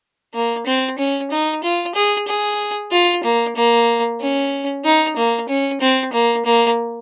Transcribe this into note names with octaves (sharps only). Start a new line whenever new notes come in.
A#3
C4
C#4
D#4
F4
G#4
G#4
F4
A#3
A#3
C#4
D#4
A#3
C#4
C4
A#3
A#3